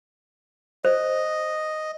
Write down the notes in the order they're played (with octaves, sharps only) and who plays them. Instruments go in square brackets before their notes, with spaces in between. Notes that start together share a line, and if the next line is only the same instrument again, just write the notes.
[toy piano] C5 [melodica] D#5